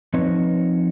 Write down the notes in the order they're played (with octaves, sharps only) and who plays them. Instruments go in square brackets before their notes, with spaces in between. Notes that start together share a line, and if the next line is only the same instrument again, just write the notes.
[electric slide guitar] F3 C4 D#4 B4 C#5